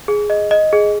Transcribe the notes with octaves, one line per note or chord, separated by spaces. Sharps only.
G#4
D#5
D#5
G#4